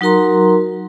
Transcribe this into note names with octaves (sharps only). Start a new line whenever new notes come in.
F#3 D#4 F#4 A#4 A#5 C6